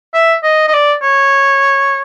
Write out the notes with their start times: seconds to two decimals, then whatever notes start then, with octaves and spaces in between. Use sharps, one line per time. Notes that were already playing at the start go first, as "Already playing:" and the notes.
0.14 E5
0.43 D#5
0.68 D#5
0.73 D5
1.02 C#5